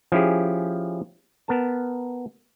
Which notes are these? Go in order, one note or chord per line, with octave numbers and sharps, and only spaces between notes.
F3 C#4 E4 G4 G#4
B3 A#4 A5